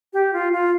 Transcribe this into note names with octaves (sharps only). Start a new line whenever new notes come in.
G4
F4
F4